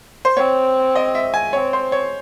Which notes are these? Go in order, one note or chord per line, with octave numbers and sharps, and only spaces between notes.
C5
C4 C#5
D#5
E5
G#5
C4 C#5
C5
C#5